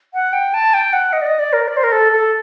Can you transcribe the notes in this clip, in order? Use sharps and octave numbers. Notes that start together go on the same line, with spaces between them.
F#5
G5
A5
G5
F#5
D#5
D5
D#5
D5
A#4
D5
C5
A#4
A4
A4